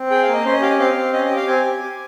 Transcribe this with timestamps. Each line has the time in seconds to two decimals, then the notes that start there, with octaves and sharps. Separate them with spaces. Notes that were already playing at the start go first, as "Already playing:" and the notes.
Already playing: C4
0.11 G#4 G5
0.23 F5
0.28 A#3
0.33 D#5
0.45 C#4 C5
0.53 D#5
0.61 G4 F5
0.70 D#5
0.79 C4 F5
0.96 C4
1.13 C#4 D#5
1.24 D#5
1.30 G4
1.36 F5
1.47 C4 G#5
1.64 G4
1.82 G4